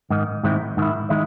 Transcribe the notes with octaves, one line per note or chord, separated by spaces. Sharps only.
G#2 D#3
G#2 D#3 G#3 C4 E4
G#2 D#3 E4
D#3 G#3 E4